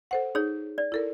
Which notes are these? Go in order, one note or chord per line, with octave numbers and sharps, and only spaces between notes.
A4 C5 F#5
D#4 G#4 C#5
D5
E4 A4 A#4